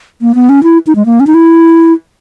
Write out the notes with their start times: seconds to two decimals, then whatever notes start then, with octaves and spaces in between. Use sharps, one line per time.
0.22 A#3
0.35 B3
0.49 C#4
0.63 E4
0.87 D#4
0.96 G#3
1.06 A#3
1.20 C#4
1.27 D#4
1.34 E4